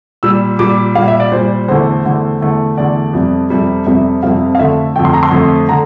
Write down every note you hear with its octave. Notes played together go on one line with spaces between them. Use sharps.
A#2 G3 E6
A#2 G3 D6
A#2 G3 F5
E5
D5
A#2 G3 C5
E2 D3 A3 C5
E2 D3 A3
E2 D3 A3
E2 D3 A3 D5
F2 C3 G3
F2 C3 G3
F2 C3 G3 E5
F2 C3 G3 F5
F5
F2 D3 A3 E5
F2 D3 A3 G5
C6
A#5
C6
F2 D3 A3
D3 A#5